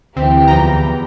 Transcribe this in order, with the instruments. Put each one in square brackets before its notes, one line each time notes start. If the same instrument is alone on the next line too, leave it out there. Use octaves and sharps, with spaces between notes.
[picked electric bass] D2 [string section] E3 G4 [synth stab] C4
[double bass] E2 [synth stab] F3 G5 A#5